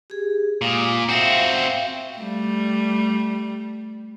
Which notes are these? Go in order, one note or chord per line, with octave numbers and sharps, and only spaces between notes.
G4 G#4
A#2 G#3 D#6
C4 F#4 E5 F5 G5
G3 A3